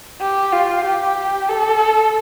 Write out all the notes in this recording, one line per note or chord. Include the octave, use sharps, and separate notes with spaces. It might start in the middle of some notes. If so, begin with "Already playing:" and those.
G4
F4
G4
A4